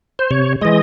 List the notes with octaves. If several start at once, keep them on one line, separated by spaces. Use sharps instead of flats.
C5
C3 C#5
E3 G#3 D#5